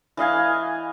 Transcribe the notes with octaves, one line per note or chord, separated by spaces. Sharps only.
E3 D#5 F5 G#5